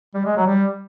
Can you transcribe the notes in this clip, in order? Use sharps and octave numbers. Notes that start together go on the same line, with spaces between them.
G3
G#3
F#3
G3